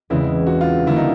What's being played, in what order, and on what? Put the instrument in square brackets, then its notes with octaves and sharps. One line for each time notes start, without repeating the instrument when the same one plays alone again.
[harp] E2 C#3 E3 G#3 C4 [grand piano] E4
[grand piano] F#4
F4
[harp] D3 G3 A#3 [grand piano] E4
[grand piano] D#4